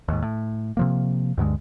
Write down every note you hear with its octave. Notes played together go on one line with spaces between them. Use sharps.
D#2 G#2
A2
C3 F3 A#3
D2 G2 D3 G#3